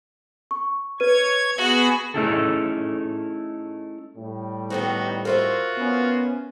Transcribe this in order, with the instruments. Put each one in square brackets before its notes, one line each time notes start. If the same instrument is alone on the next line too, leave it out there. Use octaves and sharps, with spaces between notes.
[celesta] C#6
[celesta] B4 D#7 [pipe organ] C#5 G#6
[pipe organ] B3 G#4 [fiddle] F#4
[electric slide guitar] A3 C#4 D#4 E4 G#4 A4
[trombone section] A2 G3
[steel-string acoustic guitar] D#3 B3 C4 [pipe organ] D#4 F#4
[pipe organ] F4 F#4 [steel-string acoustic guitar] A#4 C5 E5
[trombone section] B3 C#4